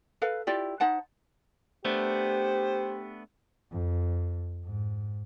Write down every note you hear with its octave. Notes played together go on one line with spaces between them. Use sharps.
A4 B4 F5
E4 F4 G4 D5
D#4 C5 F#5 A5
A3 B3 D4 G4 C5
F2
G#2